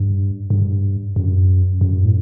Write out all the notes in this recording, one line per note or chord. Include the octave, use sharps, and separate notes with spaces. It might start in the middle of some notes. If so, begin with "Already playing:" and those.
Already playing: G2
G2
F#2
F#2
A2